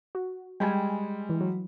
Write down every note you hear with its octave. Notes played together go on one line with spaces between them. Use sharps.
F#4
G3 G#3 G5 G#5
E3
F#3